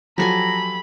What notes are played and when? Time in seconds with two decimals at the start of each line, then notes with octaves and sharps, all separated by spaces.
0.18 F3 F#3 G4 A4 G#5 A#5 B5